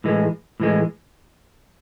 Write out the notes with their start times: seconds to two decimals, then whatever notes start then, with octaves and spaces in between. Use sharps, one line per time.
0.04 A2 E3 G#3
0.60 A2 E3 G#3